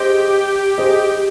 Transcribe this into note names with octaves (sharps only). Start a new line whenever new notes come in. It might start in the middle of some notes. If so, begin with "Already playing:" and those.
Already playing: G4 G#4 C5 D#5
G#4 C5 D#5